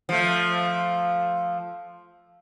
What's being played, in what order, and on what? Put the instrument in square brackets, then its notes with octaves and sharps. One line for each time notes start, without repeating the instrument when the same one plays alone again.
[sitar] F3 A3